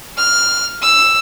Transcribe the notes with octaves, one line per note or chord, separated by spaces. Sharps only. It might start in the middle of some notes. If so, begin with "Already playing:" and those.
F6
E6